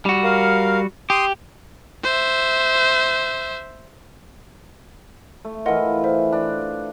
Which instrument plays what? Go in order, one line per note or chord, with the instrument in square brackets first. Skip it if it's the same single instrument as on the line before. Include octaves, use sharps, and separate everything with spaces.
[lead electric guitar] G3 F#4
[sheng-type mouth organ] A#4 F5
[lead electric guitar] G4 [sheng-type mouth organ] C6 D#6
[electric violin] C5 E5
[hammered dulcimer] A3
[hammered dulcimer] E3 F4 [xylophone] A#4 D#5 F#5
[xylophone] C5 E5
[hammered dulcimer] D4